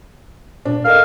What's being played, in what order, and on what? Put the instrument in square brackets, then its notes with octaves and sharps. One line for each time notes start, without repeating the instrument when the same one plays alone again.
[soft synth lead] A#2 [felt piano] D4
[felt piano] A4 D#5 [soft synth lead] A#4 [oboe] F5